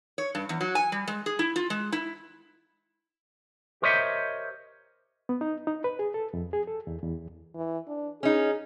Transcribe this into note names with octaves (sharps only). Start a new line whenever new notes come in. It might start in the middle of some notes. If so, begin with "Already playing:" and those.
C#5
G2
E2
F#3
G#5
G3
G#3
G#4
E4
F4
G#3
E4
G4 A#4 C5 C#5 D#5 E5
B3
D#4
D#4
B4
G#4
A4
F2
G#4
A4
E2
E2
E3
D4
C#4 D#4 G#4